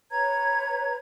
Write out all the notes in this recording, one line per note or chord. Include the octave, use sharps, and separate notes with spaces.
B4 C#5 A#5 G#6